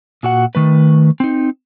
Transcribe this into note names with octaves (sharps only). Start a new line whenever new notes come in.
A#2 F#4 F#5
D#3 A3 B4
C4 D#4